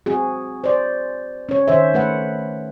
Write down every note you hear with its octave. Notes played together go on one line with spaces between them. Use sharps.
C4 F#4 G#4
C5 D5
C#4 C#5
D#3 C5 E5
A3 B4 F#5